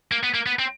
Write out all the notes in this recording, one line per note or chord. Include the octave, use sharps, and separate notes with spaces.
A#3
B3
A#3
B3
C4